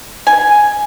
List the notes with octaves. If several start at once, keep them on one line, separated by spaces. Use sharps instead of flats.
G#5